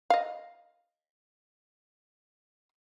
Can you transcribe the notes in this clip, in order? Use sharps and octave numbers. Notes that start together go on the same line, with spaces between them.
D#5 F5